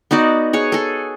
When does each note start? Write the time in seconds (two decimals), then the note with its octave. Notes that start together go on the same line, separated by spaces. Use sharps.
0.11 B3 D#4 F#4 D5
0.53 G#4 C#5 F#5
0.72 G#4 A4